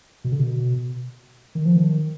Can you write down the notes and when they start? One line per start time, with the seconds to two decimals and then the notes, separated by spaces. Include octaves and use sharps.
0.24 B2
0.32 D3
0.40 B2
1.55 D#3
1.65 F3
1.76 D#3